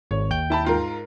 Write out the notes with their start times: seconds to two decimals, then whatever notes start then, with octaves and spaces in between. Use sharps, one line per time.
0.11 G#1 C#5
0.30 D#2 G5 G6
0.50 E4 A5 B5
0.64 G#2 F4 A#4